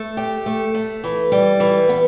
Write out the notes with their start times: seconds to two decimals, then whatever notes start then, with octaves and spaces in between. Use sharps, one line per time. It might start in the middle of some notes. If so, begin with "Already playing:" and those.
Already playing: A3
0.17 G4
0.46 A3
0.74 A3
1.04 E3
1.32 G3
1.60 E3
1.89 B3